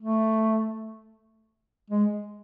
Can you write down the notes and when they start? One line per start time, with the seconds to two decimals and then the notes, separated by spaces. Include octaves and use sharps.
0.01 A3
1.90 G#3